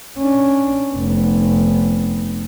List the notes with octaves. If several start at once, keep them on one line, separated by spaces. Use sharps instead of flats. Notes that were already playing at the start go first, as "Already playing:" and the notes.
C#4 D4
F1 B3